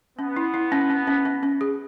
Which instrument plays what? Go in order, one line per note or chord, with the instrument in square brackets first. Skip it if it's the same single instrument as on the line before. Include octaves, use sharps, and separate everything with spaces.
[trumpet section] B3 [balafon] C#4
[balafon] E4
E4
C#4
C#4
C#4
C#4
C#4
G#4